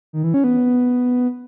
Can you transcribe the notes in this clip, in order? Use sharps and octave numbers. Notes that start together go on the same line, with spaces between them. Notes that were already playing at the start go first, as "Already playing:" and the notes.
D#3
E3
C#4
B3